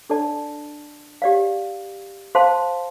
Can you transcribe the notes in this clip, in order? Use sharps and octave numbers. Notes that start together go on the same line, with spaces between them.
D4 A4 D5 A5
G4 D5 F5
C5 F5 A5 C6